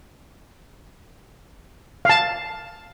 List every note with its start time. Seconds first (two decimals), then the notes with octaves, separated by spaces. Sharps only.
2.05 F5 A5